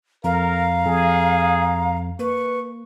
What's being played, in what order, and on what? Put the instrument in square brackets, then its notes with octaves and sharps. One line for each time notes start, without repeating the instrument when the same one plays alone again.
[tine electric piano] F2 [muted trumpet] A#4 [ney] F5 [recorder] A#5
[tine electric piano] F2 [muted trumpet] G#4
[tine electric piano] A#3 [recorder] B4 [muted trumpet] C#6